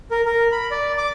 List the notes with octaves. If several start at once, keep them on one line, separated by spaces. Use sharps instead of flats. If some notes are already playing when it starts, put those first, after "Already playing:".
A#4
A#4
B5
D5
D6